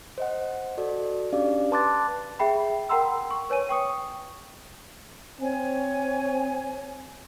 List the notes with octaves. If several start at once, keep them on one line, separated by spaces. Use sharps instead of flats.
C5 D#5 F#5
F#4 A4 D5
C#4 D4 G4 D5 F5
B4 A5 C6 D6 F#6 A6
G#4 E5 G5 B5
A#4 F#5 G5 A#5 C6 E6
C#6
B4 C#5 G#5 D#7
G5 C#6 D#6 C#7
C4 C#5 G#5